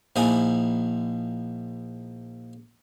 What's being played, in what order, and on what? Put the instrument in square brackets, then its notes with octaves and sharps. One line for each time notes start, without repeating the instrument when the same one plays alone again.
[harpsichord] A#1 F3 D#4 E4 G#5